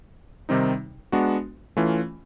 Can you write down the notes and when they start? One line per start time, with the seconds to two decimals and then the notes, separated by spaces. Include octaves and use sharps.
0.49 C3 D#3 G3 C4 D#4
1.12 G#3 B3 D4 F#4
1.77 E3 A3 C#4 F4